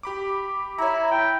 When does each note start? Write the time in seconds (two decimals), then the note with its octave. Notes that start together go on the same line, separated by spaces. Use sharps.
0.03 G4 B5 D6
0.79 E4 C#5 A#5
1.11 G5